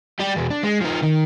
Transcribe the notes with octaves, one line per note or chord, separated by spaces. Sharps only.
G3 G4
E2 B2
D4
G#3
F3 D#4
D#3